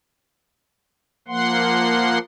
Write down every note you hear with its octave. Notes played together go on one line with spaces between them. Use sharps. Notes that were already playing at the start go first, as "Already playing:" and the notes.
F3 A#3 F#5 C6